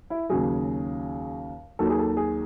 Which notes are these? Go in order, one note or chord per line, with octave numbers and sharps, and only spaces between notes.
E4
D#2 C#3 F#3 G#4
D#2 D#3 F#3 A4
G#4
A4
G#4